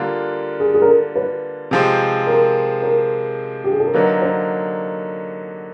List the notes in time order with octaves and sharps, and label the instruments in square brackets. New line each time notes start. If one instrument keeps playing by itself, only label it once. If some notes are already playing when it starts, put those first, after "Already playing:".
Already playing: [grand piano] D3 G3 A#3 D4 F4
[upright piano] G#4
G#4
A#4
A4
B4
[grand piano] C3 F3 G#3 C4
[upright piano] A#4
A#4
G4
G#4
A4
A#4
[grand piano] D3 F#3 A#3 D#4 [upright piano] B4
[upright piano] C5